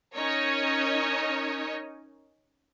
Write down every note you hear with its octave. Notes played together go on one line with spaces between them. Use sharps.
C#4 D#4 A#4 C#5 D#5